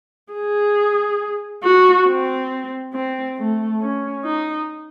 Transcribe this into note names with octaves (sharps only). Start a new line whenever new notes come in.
G#4
F#4
C4
C4
A3
C#4
D#4